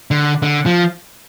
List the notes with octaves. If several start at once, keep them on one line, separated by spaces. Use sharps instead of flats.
D3
D3
F3